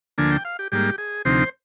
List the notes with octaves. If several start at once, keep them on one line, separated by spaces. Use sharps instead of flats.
D2 D3 F3 A#3 D4 G#5
G5
F5
G4
G#2 G3 A#3 G4
G#4
D2 C3 F3 C4 D#4 C5